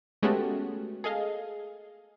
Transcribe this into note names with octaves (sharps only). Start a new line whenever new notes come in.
G#3 A3 B3 C#4 F#4 G4
G#4 A4 D#5 F5